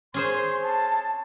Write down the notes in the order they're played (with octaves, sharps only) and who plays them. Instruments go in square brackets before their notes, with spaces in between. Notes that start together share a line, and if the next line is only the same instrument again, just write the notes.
[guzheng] C#4 G#4 C5 [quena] C6
[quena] A5